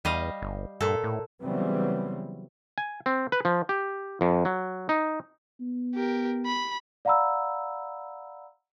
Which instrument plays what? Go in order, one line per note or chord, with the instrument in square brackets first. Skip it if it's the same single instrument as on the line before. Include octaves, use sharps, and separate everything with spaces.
[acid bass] E2 [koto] G3 D#5 F5
[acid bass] G1
[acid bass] G2 [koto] A#2 A4
[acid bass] A2
[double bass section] C#3 E3 F#3 G3 B3 C4
[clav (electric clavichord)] G#5
C4
B4
F3
G4
F2
F#3
D#4
[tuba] B3
[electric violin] G4 A#4
B5
[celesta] D5 F5 F#5 A#5 B5 E6